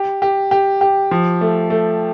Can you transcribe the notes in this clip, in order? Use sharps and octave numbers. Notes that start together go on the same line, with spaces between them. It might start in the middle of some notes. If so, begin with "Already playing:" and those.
Already playing: G4
G4
G4
G4
F3
A3
A3